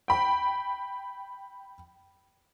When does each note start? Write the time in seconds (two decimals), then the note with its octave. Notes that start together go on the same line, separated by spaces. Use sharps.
0.08 G5 B5